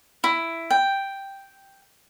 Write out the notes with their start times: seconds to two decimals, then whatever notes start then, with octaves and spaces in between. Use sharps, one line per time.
0.24 E4
0.70 G5